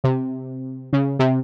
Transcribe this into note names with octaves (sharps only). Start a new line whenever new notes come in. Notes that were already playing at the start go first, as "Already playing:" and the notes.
C3
C#3
C3